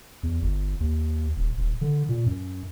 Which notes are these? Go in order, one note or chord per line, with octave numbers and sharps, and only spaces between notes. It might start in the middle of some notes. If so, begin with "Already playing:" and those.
E2
G1
D#2
D#1
D#1
D3
A#2
F#2